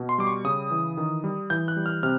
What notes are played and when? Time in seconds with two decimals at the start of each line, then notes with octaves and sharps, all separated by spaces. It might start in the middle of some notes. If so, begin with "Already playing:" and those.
Already playing: B2
0.09 C6
0.18 G3 D6
0.27 C#6
0.44 C#3 D#6
0.71 E3
0.97 D#3
1.24 G3
1.50 E3 G6
1.68 F#6
1.77 G3
1.86 F6
2.03 C3 F6